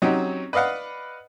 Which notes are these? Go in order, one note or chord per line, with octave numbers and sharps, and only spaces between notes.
F#3 C4 C#4 D#4 F#4 G4
B4 D5 D#5 F5 F#5